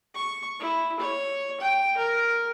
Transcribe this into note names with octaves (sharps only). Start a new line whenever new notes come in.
C#6
E4
C#5
G5
A#4